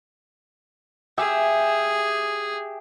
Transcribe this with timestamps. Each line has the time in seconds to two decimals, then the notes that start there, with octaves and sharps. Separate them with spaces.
1.18 G4 G#4 E5 G#5